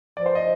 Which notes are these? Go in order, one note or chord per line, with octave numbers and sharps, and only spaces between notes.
F3 D5
C5
D#5